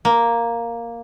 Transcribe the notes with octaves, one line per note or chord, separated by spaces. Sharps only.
A#3